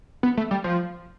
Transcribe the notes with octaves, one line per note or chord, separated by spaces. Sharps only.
B3
A3
G3
F3